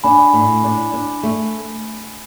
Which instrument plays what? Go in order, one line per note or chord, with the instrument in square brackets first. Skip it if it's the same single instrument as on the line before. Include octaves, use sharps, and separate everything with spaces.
[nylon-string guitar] D4 [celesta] G#5 B5
[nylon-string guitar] A2
D4
D4
A3